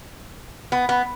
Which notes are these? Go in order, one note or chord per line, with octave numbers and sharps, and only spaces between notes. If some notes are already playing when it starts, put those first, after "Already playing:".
B3
B3